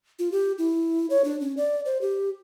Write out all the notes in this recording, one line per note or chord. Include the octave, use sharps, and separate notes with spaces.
F4
G4
E4
C#5
D4
C#4
D5
C5
G4